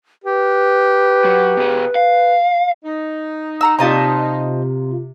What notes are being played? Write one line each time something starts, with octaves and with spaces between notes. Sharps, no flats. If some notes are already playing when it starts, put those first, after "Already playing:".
G4 B4
F#3
B2 G#4
F5
D#4
F#5 A#5 E6
C3 F4 C5 D#5 F5 A5 A#5